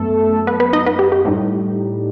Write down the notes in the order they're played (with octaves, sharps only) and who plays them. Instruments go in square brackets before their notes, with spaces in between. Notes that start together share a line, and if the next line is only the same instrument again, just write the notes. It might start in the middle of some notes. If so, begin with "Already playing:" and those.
Already playing: [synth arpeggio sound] F#2 A3 B3 A4
B3 B4
B3 B4
D#4 D#5
B3 B4
G4
G4
A2 G3 D#4